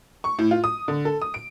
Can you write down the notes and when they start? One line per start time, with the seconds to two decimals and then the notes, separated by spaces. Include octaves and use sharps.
0.24 C#6
0.39 A2
0.51 F4
0.64 D#6
0.88 D3
1.05 A4
1.22 D#6
1.34 D7